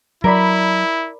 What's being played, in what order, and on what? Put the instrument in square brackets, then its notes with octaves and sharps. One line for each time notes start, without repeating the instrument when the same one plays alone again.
[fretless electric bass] F#3 [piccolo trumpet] E4 [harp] A#4 D5 B5